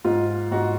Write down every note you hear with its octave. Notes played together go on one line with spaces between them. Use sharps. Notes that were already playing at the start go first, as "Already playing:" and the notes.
G#2 F4
G#2 F#4